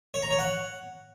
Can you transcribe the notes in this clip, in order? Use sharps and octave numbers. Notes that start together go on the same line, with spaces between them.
C#5
A#5
C#5
F#5